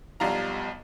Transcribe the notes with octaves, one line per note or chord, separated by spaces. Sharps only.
B1 F2 G3 F5 A#5